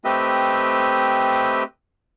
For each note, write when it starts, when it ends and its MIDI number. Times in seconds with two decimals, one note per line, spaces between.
0.05 1.63 57
0.05 1.63 60
0.05 1.63 67
0.05 1.63 71
0.05 1.63 75
0.05 1.63 76